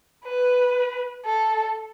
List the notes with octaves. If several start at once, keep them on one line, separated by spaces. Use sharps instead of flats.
B4
A4